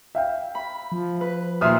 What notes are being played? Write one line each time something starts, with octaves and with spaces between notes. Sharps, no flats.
E5 F5 G5
B5
F3
B4
D#2 A#2 E5 C6 D#6 F6